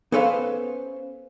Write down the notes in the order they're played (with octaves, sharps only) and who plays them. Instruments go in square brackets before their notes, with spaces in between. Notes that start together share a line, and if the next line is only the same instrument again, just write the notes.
[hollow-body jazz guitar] B3 C#4 A4 B4 C5 F5